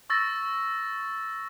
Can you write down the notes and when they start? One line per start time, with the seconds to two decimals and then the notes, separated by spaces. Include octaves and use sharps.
0.10 C#6 E6 A6 A#6